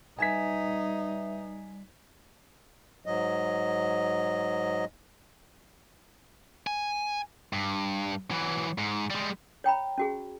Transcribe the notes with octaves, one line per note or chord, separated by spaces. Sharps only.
G3 D#4 B4 E5 G#5 G#6 B6
G#2 F#3 D#5
G#5
G2
E3 F#3
G#2
G3 G#3
C#5 G5 A#5 B5
C#4 F#4 G#4